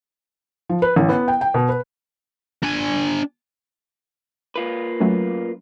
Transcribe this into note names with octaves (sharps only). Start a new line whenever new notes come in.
F3
B4
A1
B3
G5
G5
B2
B4
D4 G#5
A#3 F4 B4
F#3 A3 C#4